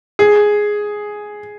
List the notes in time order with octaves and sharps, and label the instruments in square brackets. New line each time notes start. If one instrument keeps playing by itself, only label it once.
[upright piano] G#4